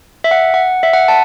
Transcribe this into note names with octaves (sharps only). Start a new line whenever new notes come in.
E5
F#5
F#5
E5
F#5
A5